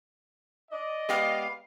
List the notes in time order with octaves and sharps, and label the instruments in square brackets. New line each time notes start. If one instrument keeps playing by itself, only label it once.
[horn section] D5 D#5
[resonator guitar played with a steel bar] G#3 B3 G4 [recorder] F5